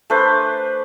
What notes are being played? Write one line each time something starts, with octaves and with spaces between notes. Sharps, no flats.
A3 D4 B4 C5